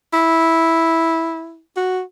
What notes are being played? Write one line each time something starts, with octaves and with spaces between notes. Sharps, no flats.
E4
F#4